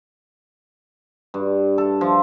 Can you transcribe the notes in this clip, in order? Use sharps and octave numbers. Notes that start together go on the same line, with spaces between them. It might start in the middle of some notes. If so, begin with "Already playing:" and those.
G2
A4
F3